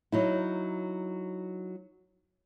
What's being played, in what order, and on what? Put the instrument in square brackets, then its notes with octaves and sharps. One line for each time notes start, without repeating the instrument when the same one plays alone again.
[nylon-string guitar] F#3 D#4 E4